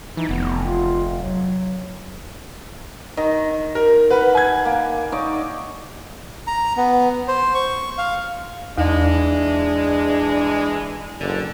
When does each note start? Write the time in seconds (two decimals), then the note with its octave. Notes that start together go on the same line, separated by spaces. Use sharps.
0.17 E3 D#4
0.29 F1 B3
0.63 F4
1.21 F#3
3.17 D#3 D#5
3.75 A#4
4.10 B4 F#5 B5
4.35 G#5 G#6
4.65 A#3
5.12 D#4 C#5 D5
6.47 A#5
6.77 B3
7.28 C5
7.55 C#6
7.98 F5
8.78 E2 E3 G#3 D4
11.20 F#1 D3